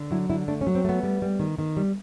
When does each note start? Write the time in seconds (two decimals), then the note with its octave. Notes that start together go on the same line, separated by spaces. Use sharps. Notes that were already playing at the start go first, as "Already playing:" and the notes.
Already playing: D3
0.11 F#3 E4
0.30 D3 E4
0.48 A3 D4
0.61 C#4
0.67 F#3
0.75 C4
0.85 A3 B3
1.03 G3
1.22 G3
1.39 D#3
1.58 D#3
1.77 G3